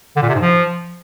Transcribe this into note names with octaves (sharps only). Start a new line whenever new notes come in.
D3
A#2
C3
G#2
F3